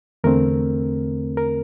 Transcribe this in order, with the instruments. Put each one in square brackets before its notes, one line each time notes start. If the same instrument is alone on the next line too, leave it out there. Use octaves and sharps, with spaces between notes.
[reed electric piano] E2 D3 A3 C4 A#4
A#4